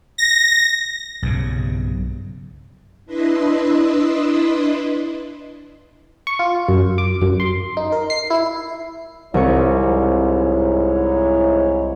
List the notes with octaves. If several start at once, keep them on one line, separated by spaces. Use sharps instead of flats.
A#6
B1 G2 C#3
D4 E4 B4 D#5 E5 C6
C#6
F4
F#2
D6
F#2
C6
D#4
A#4
C7
E4
C2 G#2 E4 C#5 C#6